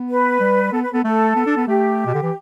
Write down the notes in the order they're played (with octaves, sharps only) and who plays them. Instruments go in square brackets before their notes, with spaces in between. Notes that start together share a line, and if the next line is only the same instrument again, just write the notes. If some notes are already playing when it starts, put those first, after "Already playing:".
Already playing: [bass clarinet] B3
[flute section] B4
[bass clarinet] G3
[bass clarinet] B3 [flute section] A4
[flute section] B4
[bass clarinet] B3 [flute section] A4
[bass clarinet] A3 [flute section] A4
[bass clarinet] B3
D4
B3
[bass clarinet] A3 [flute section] G4
[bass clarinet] B2
D3
E3